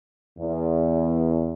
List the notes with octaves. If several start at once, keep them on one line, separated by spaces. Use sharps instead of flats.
E2